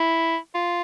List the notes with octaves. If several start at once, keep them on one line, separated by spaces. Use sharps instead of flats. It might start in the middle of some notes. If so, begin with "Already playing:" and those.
Already playing: E4
F4